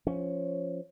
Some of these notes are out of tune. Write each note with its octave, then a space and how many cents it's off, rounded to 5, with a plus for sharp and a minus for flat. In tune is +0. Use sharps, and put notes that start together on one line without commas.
F3 +0 C#4 +5